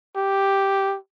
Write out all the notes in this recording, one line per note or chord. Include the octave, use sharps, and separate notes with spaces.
G4